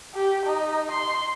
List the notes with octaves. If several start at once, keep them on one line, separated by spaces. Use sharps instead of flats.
G4
D#4
C6